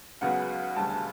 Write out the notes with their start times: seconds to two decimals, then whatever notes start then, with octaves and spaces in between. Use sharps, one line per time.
0.21 C#2 C#3 F#3 B3 F#5
0.76 E1 D2 C#3 G3 A5